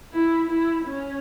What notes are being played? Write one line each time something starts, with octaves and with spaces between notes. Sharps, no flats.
E4
E4
C#4